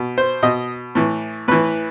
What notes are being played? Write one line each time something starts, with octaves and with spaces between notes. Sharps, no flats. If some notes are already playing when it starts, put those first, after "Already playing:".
Already playing: B2
C5
B2 D#5
A2 E3
A2 E3 B4